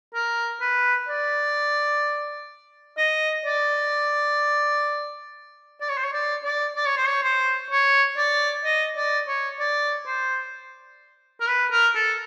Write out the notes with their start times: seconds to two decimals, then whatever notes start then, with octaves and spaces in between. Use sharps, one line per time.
0.14 A#4
0.61 B4
1.08 D5
2.98 D#5
3.45 D5
5.81 D5
5.89 C#5
5.97 C5
6.04 C#5
6.13 D5
6.44 D5
6.76 D5
6.86 C#5
6.97 C5
7.08 C#5
7.23 C5
7.70 C#5
8.17 D5
8.65 D#5
8.97 D5
9.27 C#5
9.60 D5
10.06 C5
11.41 A#4
11.48 B4
11.71 A#4
11.95 A4